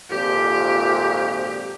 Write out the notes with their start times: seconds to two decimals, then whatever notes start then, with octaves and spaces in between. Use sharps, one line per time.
0.10 G#1 F2 A#2 G4